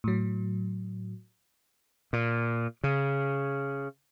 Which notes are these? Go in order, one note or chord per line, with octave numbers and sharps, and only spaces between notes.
A2 F#3
A#2
C#3